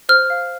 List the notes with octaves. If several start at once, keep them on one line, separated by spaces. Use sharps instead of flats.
C5 F6
F5